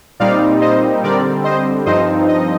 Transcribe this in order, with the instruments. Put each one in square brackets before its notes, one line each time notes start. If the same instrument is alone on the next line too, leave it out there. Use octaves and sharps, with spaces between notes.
[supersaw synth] A#2 G3 C4 D#4 D5 F5
C5 D#5
D3 G3 C4 A#4 D5
C5 D#5
G2 F3 C4 D#4 C5 D#5
D#5